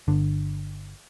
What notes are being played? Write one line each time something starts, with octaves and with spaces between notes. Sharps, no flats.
G1 D3